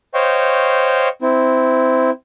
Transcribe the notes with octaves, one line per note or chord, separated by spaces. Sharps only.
C5 C#5 D#5 F5 G5 C#6
C4 E4